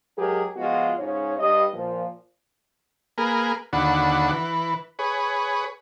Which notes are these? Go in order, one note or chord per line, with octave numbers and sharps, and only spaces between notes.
F#3 G#3 G4 G#4 A#4
F3 G#3 B3 F4 F#4
G#2 C#3 C#5
G2 D#5
A#2 F3
A#3 G#4 A#4 B4
D#2 D3 D4 F#4 F#5 B5
E3 B4
G#4 B4 C#5